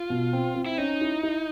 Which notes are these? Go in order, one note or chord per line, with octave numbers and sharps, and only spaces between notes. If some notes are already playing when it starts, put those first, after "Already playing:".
Already playing: F4
B2
C4
C4
E4
C#4 D#4
E4
E4